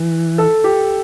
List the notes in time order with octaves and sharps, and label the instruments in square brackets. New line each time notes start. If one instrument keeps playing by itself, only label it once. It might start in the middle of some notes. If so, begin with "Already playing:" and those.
Already playing: [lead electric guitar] E3
[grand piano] A4
G4